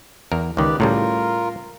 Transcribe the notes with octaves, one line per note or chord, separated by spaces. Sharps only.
E2 A#4
C#2 D#3 G4 B4 D5
A2 C#3 G3 F4 A#4